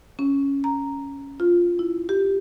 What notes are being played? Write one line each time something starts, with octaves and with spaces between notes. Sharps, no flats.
C#4
A#5
F4
E4
G4